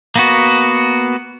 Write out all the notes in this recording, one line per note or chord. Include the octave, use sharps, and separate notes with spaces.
A#3 B3 F#4